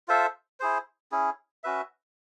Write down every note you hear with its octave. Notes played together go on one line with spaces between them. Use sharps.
F4 A4 C5 E5
E4 G#4 C5
C#4 E4 G#4
C#4 F#4 B4 E5